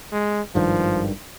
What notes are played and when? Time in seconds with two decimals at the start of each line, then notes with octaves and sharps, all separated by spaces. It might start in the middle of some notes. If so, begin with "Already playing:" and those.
0.12 G#3
0.55 G#1 G2 D#3 F3